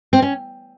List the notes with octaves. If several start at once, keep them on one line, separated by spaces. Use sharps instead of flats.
C4
C#4